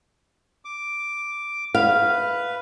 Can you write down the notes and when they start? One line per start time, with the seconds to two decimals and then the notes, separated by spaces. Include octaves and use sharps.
0.65 D6
1.75 B4 F5